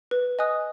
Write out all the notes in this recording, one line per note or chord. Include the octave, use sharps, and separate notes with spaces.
B4
D#5 G#5 D#6 F#6